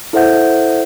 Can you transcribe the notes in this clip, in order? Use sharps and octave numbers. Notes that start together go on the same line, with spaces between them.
E4 A4 C5 E5 F#5 G6